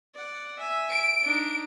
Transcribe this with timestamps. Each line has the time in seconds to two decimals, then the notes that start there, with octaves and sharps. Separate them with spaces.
0.14 D5 F#5
0.59 E5 G#5
0.90 D7
1.22 D4 D#4